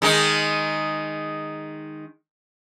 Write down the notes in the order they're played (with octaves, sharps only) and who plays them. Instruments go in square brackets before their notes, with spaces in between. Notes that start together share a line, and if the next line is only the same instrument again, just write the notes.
[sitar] D#3 G#3 D#4